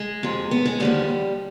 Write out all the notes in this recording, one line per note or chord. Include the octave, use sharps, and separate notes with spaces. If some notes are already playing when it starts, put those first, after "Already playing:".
Already playing: G#3
F2 C3 F3
B3
G#3
D#2 D3 F3 G3